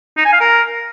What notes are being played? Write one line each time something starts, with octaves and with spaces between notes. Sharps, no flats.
D#4
G#5
F5
A#4